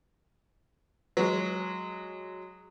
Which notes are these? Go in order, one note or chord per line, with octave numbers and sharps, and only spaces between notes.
F#3 G#3